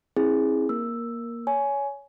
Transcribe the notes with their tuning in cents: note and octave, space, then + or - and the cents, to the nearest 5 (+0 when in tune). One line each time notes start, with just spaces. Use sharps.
C4 +35 E4 -20 G#4 +0
A#3 +15 A#4 +0 E6 +0
C#5 +20 G#5 +15